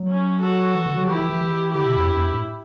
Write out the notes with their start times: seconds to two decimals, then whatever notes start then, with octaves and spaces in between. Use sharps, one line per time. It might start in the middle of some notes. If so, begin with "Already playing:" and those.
Already playing: F#3
0.08 C#4
0.41 F#4 A4
0.75 E3
0.86 D3
0.97 F#3
1.07 E3 E4 G4
1.19 E3
1.30 E3
1.41 E3
1.74 D3 E4 G4
1.86 B2
1.96 E2
2.08 G2
2.17 E2
2.25 G2
2.33 A2